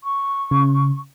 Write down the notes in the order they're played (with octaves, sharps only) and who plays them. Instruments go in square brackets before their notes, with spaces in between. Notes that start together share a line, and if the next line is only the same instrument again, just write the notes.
[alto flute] C#6
[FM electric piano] C#3